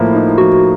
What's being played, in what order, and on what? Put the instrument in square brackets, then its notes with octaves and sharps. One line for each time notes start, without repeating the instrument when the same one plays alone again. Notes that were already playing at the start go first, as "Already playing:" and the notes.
Already playing: [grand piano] A2 F3 A#3 [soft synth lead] E4
[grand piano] D#4
[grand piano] F3 [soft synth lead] F#4